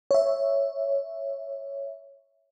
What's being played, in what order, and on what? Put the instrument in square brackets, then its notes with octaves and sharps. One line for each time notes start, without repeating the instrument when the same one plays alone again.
[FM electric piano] C#5 E5